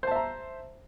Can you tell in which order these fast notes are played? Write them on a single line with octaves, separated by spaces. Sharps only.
C5 A5 E5 A#5